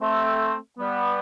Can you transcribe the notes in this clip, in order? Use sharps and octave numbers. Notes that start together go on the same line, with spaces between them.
A3 C4
G3 B3